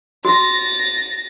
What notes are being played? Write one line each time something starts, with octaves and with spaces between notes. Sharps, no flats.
F#4 A6 A#6